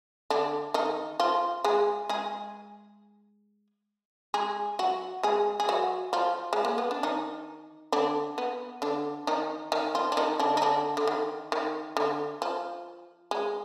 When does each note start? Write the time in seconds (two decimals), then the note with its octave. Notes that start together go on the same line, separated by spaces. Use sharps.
0.30 D3 D4
0.74 D#3 D#4
1.20 F3 F4
1.64 G#3 G#4
2.09 G#3 G#4
4.34 G#3 G#4
4.79 F#3 F#4
5.23 G#3 G#4
5.60 G#4
5.69 F#3 F#4
6.13 F3 F4
6.53 G#3
6.65 A#3
6.78 B3
6.91 D4
7.03 D#3 D#4
7.92 D3 D4
8.38 B3
8.82 D3 D4
9.27 D#3 D#4
9.72 D#3 D#4
9.95 F3 F4
10.12 D4
10.17 D#3 D#4
10.39 D3 D4
10.57 D#4
10.62 D3 D4
10.97 D3
11.07 D#3
11.52 D#3
11.97 D3
12.42 F3
13.31 G#3